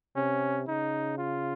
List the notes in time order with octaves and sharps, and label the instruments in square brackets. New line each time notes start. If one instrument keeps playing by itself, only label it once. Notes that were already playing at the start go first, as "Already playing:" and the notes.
[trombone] C3 [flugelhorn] C#4
[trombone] C#3 [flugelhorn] D#4
[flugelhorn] F4